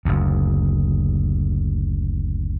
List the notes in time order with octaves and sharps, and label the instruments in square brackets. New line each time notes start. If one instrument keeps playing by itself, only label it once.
[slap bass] F#1 D2